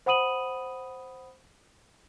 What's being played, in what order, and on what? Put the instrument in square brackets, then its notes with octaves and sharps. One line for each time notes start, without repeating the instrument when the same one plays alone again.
[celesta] C5 F#5 B5 D#6 D#7 F#7